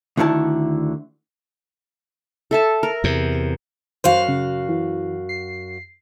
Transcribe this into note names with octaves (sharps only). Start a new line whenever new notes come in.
D2 D3 D#3 E4 A5
A4 E5 A5
A#4
E2 C3
F#2 F#4 C5 F5
C#3
E3
C7